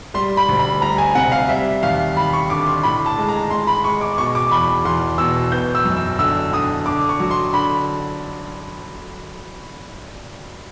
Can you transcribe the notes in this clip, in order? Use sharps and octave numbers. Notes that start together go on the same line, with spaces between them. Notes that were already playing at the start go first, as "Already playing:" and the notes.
G3 C6
B5
D2
B5
G3 A#5
G#5
C3 F#5
F5
G3 E5
D#2 F5
D#2 B5
C#6
D3 D6
C6
A2 B5
A5
G#3
A#5
G#3 C6
B5
G#3 C#6
D6
B2 C#6
D6
E2 B5
E2 C6
B2 E6
B3 G6
E6
F#2
E6
D3 E6
D3 D#6
D3 D6
C#6
F#3
C6
D3 B5